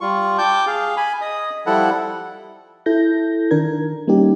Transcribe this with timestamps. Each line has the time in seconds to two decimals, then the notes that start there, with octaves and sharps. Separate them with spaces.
0.01 G3 F4 C#6
0.38 G5 A5 D6 G6
0.67 G#4 F5
0.97 G#5 B5
1.21 D#5 D#6
1.66 F3 G3 E4 A4 F#5
2.86 E4 A4 G6 A#6
3.51 D#3 D4 A#4 G#6
4.08 G3 A#3 C#4 D#4 G4